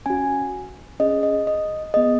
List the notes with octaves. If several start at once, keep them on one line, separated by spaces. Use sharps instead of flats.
C#4 F#4 G#5
C#4 G#4 D#5
D#5
D#5
B3 G#4 D#5